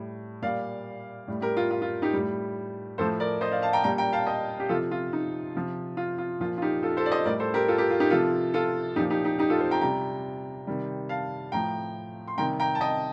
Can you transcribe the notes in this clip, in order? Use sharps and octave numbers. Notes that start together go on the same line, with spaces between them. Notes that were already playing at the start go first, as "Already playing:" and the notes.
Already playing: A2 G3
A#2 G3 D5 F5
A2 G3
G4 A#4
F4
F4
F4
D#4 G4
A2 G3
A2 F3 A4 C5
A#4 D5
C5 D#5
D5 F5
F5 A5
G5 A#5
A#2 G3 G5 A#5
G5 A#5
F5 A5
D#5 G5
G4
C3 F3 F4 A4
F4
D#4
C3 F3
F4
F4
A#2 F3 F4
F4
D#4 G4
F4 A4
A4 C5
D5
C5 D#5
A2 G3 A#4 D5
A4 C5
G4 A#4
F4 A4
G4 A#4
F4
D#4 G4
C3 F3 F4 A4
F4 A4
A#2 F3 D#4 G4
D#4 G4
D#4 G4
D#4 G4
F4 A4
A4 C5
G5 A#5
C3 G3 G5 A#5
C3 D#3 G3
F5 A5
A2 F3 G5 A#5
C6
C3 D#3 G3 G5 A#5
G5 A#5
A5
D#5 G5